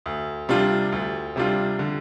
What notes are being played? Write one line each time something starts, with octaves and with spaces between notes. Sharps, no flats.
D2
C3 G3 D4 F4
D2
C3 G3 D4 F4
D3